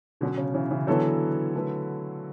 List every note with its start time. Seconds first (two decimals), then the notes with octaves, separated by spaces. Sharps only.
0.21 B2 D3 F#3 C#4 F#4 C#5
0.38 C#3
0.54 C#3 E3
0.71 C#3 E3
0.87 D3 E3 F#3 B3 E4 A4 C#5
1.55 A3 E4 B4